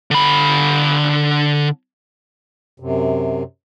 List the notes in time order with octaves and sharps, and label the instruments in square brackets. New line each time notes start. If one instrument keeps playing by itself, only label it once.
[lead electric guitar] D3 B5
[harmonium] F#2 C3